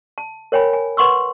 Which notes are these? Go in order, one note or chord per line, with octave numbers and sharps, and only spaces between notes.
A5
A#4 C#5 G5 G#5 B5
G#5
B4 F#5 C6 C#6 E6